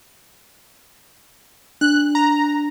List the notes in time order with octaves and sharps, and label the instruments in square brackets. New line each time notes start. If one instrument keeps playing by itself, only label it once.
[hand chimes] D4 [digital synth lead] F#6
[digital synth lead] A#5